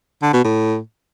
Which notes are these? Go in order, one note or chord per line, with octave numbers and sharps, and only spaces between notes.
D3
B2
A2